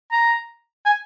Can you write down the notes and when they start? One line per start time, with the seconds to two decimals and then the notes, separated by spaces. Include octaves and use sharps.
0.12 A#5
0.86 G#5